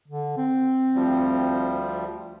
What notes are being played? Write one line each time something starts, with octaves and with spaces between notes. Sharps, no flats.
D3
C4
D2 F3 G3